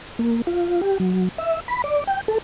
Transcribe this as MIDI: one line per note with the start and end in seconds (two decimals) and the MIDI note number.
0.19 0.42 58
0.47 0.81 65
0.81 0.98 67
1.00 1.29 54
1.38 1.60 76
1.68 1.82 83
1.84 2.04 74
2.07 2.21 79
2.28 2.38 69